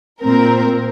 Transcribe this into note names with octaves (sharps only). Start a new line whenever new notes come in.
A#2 C4 A#4